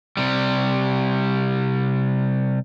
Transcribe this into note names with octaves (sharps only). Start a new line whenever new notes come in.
C3 G3